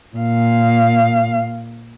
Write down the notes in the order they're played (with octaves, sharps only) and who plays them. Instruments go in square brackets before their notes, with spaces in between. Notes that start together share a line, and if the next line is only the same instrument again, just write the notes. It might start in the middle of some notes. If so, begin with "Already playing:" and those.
[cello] A#2 F5